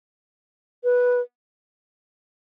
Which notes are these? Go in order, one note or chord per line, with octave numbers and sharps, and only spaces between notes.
B4